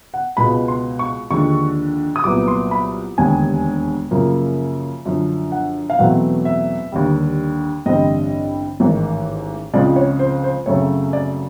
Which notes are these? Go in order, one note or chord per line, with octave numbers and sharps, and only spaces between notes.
F#5
C#2 B2 G#3 B5
C6
C#6
D#2 D3 F3 G#3 C#6
D#6
C2 A#2 F#3 B3 D6
C6
B5
E1 D#2 D3 G3 G#5
F#2 C#3 F3 A#3
F#2 D3 F3
F#5
F5
E2 B2 F#3 A3 C4 F#5
E5
D#2 D3 G3
A1 G2 D3 G3 C4 D#5
A1 G#2 D#3
C#2 C#3 F3 G#3 C4 D5
C#5
C5
C5
F#2 C#3 F#3 A3 C4 C#5
D5